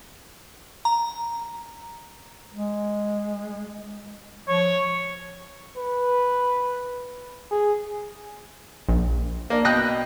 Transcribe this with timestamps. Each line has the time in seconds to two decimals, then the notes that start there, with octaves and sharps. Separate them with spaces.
0.85 A#5
2.54 G#3
4.48 F3 C#5
5.77 B4
7.51 G#4
8.89 A#1
9.50 A#3 D4
9.65 B2 D#5 G5 F#6 A#6